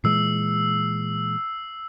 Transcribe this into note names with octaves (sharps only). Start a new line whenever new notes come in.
A#2 E3 G#3 E6 C7